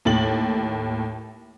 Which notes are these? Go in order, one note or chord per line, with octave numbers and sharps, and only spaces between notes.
D#2 A2 A6 F#7